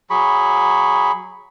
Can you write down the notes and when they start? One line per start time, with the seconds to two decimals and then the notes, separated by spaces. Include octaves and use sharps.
0.10 F#3 G#4 B5 C#6